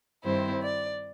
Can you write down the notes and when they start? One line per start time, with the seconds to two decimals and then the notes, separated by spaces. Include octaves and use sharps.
0.23 G2 D#3 G3 C4 E4 C5
0.62 D5